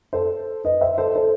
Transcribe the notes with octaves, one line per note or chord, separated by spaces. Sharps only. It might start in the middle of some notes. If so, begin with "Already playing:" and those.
A4 C5
B4 D#5
C5 E5
A4 C5
A4 C5